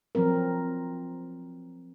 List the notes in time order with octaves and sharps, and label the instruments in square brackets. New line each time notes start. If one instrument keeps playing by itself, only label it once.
[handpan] F3 F#3 C4 A#4